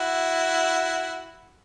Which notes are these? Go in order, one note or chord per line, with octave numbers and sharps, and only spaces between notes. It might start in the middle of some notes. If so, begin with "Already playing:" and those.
Already playing: E4 F#4